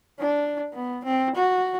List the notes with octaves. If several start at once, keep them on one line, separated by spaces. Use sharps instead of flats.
D4
B3
C4
F#4